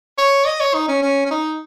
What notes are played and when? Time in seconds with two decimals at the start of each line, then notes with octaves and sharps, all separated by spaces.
0.18 C#5
0.46 D#5
0.60 C#5
0.74 D#4
0.88 C#4
1.02 C#4
1.25 C#4
1.31 D#4